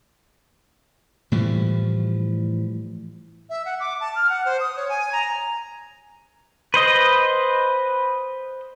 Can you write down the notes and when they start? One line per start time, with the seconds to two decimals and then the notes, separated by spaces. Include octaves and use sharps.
1.32 A2 E3 F3 G3
3.50 E5
3.65 F#5
3.80 D6
4.01 A5
4.15 F6
4.29 F#5
4.45 C5
4.60 D#6
4.76 C#5
4.89 G#5
5.13 A#5
6.74 B4 C5 D#5